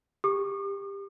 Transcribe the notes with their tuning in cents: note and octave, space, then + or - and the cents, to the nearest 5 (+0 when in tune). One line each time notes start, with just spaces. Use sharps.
G4 +20 D6 +45